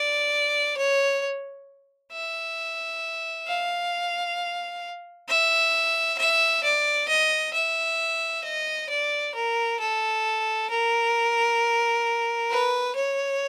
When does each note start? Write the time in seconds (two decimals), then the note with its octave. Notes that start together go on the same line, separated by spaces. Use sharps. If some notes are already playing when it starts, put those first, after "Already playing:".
Already playing: D5
0.77 C#5
2.12 E5
3.47 F5
5.28 E5
6.18 E5
6.63 D5
7.08 D#5
7.54 E5
8.43 D#5
8.89 D5
9.34 A#4
9.79 A4
10.70 A#4
12.50 B4
12.96 C#5